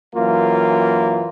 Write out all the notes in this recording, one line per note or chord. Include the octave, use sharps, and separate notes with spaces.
F#2 E3 A#3 F4